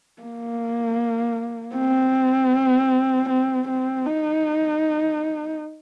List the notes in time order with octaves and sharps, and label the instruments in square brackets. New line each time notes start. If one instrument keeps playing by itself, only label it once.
[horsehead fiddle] A#3
C4
C4
C4
D#4